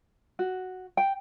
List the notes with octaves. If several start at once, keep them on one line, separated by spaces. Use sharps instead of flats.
F#4
G5